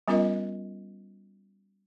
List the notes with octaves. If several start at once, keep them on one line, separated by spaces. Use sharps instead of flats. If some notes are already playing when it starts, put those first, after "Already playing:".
G3 B3 C#4 F4 A#4 D#5